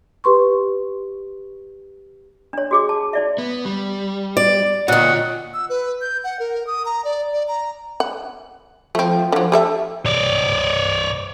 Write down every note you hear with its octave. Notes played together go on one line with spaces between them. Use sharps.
G4 B4 C6 C#6
D4 C#5
F#4 G#4 D6
A5
D#4 D5 E5
B3
G3
D5
A#2 D#3 F4 C#5 F#5
E6
B4
G6
F#5
A#4
D#6
A#5
D5
D5
A#5
F#5
F3 A3 C4
D3 F#3
G4 A4 E5
C#5 D5